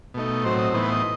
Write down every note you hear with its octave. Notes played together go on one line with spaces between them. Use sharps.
B2 A3 D#4
A2 F#3 C4 C5
D#5
A2 E3 B3 D#4 C5
B4
C5
D#5